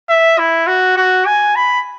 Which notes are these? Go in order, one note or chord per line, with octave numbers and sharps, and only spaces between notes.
E5
E4
F#4
F#4
G#5
B5